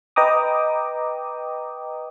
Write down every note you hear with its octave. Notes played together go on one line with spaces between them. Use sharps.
B4 D#5 G5 A#5 D6 D#6